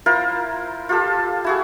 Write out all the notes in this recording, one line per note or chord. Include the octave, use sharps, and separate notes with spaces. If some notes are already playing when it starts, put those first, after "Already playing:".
E4 F4 A#4 C5
F4 G4 A4
E4 F#4 G#4